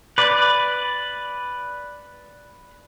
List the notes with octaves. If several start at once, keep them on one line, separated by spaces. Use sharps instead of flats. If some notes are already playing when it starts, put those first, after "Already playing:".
B4 D5